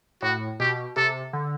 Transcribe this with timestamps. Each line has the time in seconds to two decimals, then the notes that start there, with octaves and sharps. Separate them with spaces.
0.22 A2 F#4
0.60 B2 G4
0.96 C3 A4
1.33 D3